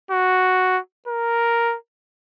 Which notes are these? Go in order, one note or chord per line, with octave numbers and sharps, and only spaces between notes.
F#4
A#4